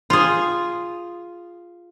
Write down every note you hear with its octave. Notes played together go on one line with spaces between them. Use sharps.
F4 G#4